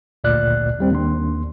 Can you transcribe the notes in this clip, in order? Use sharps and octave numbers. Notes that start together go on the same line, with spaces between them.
G#1 D2 A#2 D5 F6 F#6
D#2 G3 C4
D#2 D4 C6